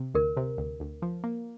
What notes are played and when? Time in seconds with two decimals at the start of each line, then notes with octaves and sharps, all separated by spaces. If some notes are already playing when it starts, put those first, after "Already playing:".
Already playing: C3
0.14 D2 A#4
0.37 C3
0.58 D2
0.80 D2
1.02 F3
1.24 A#3